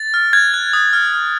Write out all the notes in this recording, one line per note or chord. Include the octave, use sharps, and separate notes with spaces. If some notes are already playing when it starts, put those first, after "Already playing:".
Already playing: A6
F6
F#6 G#6
F#6
D#6
F6
F6